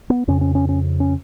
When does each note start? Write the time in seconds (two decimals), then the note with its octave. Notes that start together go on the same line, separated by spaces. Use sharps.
0.10 B3
0.28 F2 C#3 C#4
0.41 C#4
0.55 C#4
0.69 C#4
1.00 C#4